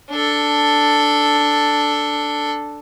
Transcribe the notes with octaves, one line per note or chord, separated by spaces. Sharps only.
D4 A4